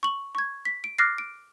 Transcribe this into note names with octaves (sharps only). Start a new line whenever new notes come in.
C#6 F#7
C#6 G#6
B6
D7
D6 F6 F#6 A6 A#6 C7
D7